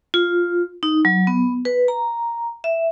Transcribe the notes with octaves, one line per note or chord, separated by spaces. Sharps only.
F4
D#4
F#3
B3
B4
A#5
E5